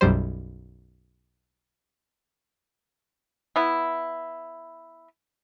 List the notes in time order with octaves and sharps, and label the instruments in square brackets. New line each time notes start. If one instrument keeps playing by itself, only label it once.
[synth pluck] B1 F#2 G3 C5
[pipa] B3 E4